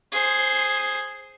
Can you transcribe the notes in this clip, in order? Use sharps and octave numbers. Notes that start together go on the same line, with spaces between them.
G#4 C5